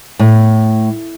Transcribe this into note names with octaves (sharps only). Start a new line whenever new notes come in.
A2